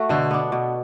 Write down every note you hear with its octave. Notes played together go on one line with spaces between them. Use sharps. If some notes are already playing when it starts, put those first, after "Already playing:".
Already playing: A3 F#4
B2 D3
B3 D4
B2